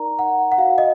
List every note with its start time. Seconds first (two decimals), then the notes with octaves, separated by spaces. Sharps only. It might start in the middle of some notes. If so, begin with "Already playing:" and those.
Already playing: D#4 A#4 D5 A#5
0.19 F#5
0.52 F#5
0.58 F#4 D5 F5
0.78 D#5